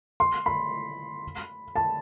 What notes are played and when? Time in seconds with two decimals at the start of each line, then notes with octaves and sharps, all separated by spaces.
0.20 C6
0.46 B5
1.76 A5